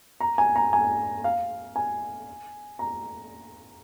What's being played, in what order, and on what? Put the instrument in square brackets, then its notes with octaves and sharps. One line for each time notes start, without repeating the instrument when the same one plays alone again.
[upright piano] A#5
G#5
A#5
G#5
F5
G#5
A#5